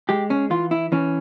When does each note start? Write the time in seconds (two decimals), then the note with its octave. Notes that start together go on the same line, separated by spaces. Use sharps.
0.09 G#3 G4
0.30 C#4
0.50 E3 F4
0.71 E4
0.92 E3 C#4